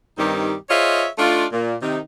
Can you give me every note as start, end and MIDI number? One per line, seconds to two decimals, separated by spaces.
0.18 0.54 43
0.18 0.54 51
0.18 0.54 55
0.18 0.54 60
0.18 0.54 63
0.18 0.54 67
0.70 1.06 65
0.70 1.06 68
0.70 1.06 72
0.70 1.06 73
0.70 1.06 75
0.70 1.06 76
1.18 1.46 57
1.18 1.46 62
1.18 1.46 63
1.18 1.46 65
1.52 1.74 46
1.82 1.98 48
1.82 1.98 51
1.82 1.98 63